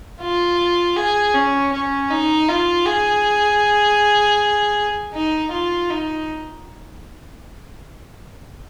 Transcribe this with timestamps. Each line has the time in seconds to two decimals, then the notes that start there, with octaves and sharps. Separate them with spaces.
0.21 F4
0.96 G#4
1.34 C#4
1.72 C#4
2.10 D#4
2.48 F4
2.86 G#4
5.13 D#4
5.51 F4
5.90 D#4